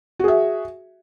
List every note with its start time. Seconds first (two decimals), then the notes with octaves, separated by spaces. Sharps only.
0.19 F#4
0.24 G#4
0.28 E5